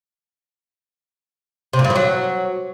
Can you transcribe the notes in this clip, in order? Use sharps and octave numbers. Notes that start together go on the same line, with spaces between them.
C3
A#2
G2
F3
F#3